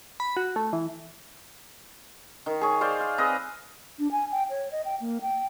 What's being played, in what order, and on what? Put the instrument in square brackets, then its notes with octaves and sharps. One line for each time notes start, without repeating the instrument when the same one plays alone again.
[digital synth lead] B5
F#4
A3
E3
[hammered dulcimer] D#3
G#4 C#5
C5 D5 F5
F5
C4 G#4 B4 D#5
[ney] D4
G#5
G5
C#5
D#5
G5
A#3
G5